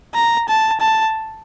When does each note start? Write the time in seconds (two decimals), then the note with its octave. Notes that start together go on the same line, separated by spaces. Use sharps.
0.15 A#5
0.48 A5
0.80 A5